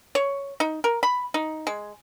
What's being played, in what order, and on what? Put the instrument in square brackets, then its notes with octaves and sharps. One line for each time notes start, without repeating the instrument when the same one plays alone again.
[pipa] C#5
D#4
A#4
B5
D#4
G#3